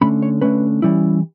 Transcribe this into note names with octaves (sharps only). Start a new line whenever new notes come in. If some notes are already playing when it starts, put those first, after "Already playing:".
D3 A3 C#4 B5
C#5
D3 A3 C#4 B4
E3 G3 C#4 E4